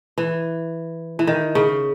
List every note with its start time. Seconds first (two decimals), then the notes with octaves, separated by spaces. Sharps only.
0.18 E3
1.19 E3
1.27 D#3
1.55 C#3